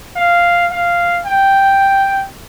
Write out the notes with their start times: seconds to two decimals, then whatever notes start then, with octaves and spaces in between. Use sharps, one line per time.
0.16 F5
0.71 F5
1.26 G5